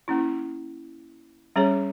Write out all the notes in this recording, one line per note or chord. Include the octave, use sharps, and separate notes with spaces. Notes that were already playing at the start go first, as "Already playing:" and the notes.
A#3 C#4 E4
G3 C#4 G#4 C#5